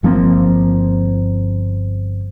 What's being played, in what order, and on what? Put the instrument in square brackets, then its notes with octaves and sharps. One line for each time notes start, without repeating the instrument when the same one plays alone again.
[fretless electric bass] G1 F3 A#3 C4